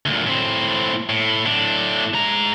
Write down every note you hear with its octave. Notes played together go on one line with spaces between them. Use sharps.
D2 A#2
A2 C4
A2
A2 D4
G#3 A#5